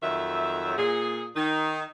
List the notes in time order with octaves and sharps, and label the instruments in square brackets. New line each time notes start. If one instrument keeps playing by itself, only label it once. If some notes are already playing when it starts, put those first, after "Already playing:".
[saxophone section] F2 D#3 F#3 E5
A#2 G#4
D#3 D#4